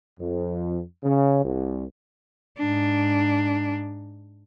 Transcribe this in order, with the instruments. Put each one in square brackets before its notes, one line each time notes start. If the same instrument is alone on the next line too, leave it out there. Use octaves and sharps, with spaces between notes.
[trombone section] F2
C#3
C2
[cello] G#2 D4